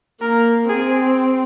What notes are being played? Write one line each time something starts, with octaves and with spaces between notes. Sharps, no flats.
A#3 A#4
C4 G#4